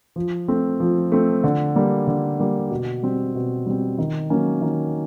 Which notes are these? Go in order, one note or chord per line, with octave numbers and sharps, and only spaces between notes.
F3
A3 C4
F3
A3 C4
D3
G3 A#3
D3
G3 A#3
B2
G3 C4
B2
G3 C4
D#3
F#3 A#3 C#4
D#3